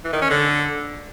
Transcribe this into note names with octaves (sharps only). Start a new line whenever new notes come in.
E3
D#3
C#4
D3